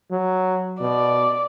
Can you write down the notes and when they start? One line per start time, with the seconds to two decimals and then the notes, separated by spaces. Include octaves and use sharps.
0.11 F#3
0.81 B2 D5